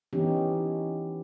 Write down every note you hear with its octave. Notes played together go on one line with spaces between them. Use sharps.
E3 B3 C#4 D#4 G4